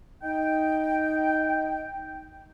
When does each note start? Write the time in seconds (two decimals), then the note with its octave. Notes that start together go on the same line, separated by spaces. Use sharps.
0.23 D#4 G5